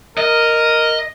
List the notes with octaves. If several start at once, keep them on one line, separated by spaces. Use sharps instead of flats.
A#4 D#5